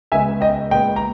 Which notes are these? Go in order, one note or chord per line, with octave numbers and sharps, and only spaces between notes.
C#2 C#3 G#3 B3 E5 G#5
D#5 G5
A#2 G#3 B3 D#5 G5
A#5